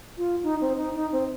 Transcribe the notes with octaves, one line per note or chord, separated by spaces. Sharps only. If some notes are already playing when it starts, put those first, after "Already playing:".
F4
D#4
C4
D#4
D#4
C4